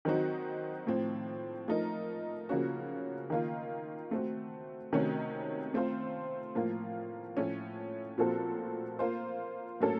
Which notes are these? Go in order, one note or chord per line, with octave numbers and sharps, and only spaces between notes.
D#3 F#3 C4 D#4 F#4
A2 F3 C4
F3 A3 D#4 A#4
C#3 F3 A#3 C#4 F#4
D#3 A#3 F4
A3 C4 F#4
C3 D#3 A3 C#4 F#4
A3 C4 F4 C5
A2 F3 A#3 F4
A2 F3 A3 C#4
A#2 F3 C4 F#4 A4
A#3 F4 C5
A2 F#3 A#3 C#4 A4